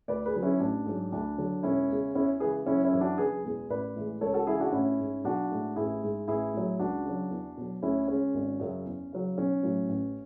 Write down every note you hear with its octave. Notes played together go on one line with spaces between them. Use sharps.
D2 B4 D5
G#4 B4
D3 F#3
C#4 E4
A1 D4
G#2 F#3
D2 D4
D3 F#3
E1 C#4 E4
E2 C#3 G#3
E2 C#4 E4
C#3 E3 G#3 G#4 B4
F#1 C#4 E4
C#4 E4
F#2 E3
D4 F#4
F#1 G#4 B4
E2 B2 G#3
A1 B4 D5
A2 E3 G#3
C#2 A4 C#5
F#4 A4
C#3 E3 G#3 E4 G#4
D4 F#4
A1 C#4 E4
G#2 G#3
B1 D4 F#4
A2 G#3
A1 E4 G#4
G#2 G#3
A1 E4 G#4
A2 F#3
C#2 D4 F#4
C#3 F#3
E2
B2 F#3
D2 C#4 E4
C#3 G#3 C#4
G#1
F#2 C#3 F#3
E2
C#3 F#3
B1 C#4
A2 F#3
A1